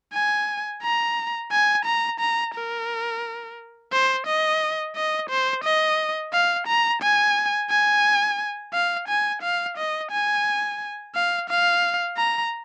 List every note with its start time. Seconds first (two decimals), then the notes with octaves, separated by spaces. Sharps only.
0.13 G#5
0.83 A#5
1.52 G#5
1.85 A#5
2.20 A#5
2.55 A#4
3.92 C5
4.27 D#5
4.96 D#5
5.30 C5
5.64 D#5
6.33 F5
6.67 A#5
7.02 G#5
7.70 G#5
8.73 F5
9.08 G#5
9.42 F5
9.77 D#5
10.11 G#5
11.15 F5
11.50 F5
12.17 A#5